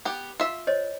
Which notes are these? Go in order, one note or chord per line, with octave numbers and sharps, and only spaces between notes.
B3 G4
F4 E5
C5 C#5 D#5